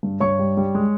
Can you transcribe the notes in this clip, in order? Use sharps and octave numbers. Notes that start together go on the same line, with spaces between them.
G2
G2 C#5 C#6
G3
G3
G#3